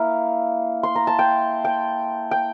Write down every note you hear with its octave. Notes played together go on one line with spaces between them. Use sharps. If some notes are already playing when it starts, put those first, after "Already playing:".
Already playing: A#3 E4 F5
C6
A#5
A5
G5
G5
G5